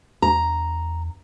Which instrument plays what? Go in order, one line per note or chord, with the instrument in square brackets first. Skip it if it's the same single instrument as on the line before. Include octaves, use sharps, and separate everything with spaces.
[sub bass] E2 [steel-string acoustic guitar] A#5